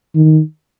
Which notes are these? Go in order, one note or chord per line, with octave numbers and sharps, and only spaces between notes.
D#3